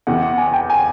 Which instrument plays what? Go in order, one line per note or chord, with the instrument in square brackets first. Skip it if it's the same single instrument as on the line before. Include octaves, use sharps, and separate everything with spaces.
[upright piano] E2 C3 E3 F#5
F#5
G#5
G5
G#5